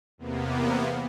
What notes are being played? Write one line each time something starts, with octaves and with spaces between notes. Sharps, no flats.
E2 C3 A#3 B3